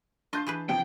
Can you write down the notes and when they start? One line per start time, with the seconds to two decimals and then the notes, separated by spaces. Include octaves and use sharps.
0.33 D4 F4 D#5 A5 G6 C7
0.47 E3 G#4 B4
0.69 F2 C3 F3 G5